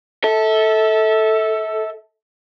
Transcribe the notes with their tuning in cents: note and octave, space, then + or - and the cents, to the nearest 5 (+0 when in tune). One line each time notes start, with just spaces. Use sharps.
A4 +0 E5 -35